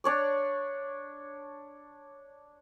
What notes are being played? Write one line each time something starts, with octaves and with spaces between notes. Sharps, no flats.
D4 C#5 D5